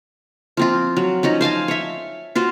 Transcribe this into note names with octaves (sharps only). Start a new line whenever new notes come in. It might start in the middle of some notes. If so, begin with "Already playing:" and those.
F3 C4 F4
F#3
F3 C#4 D#4
C5 F5 G#5 A5
C#5 E5
F4 F#4 C5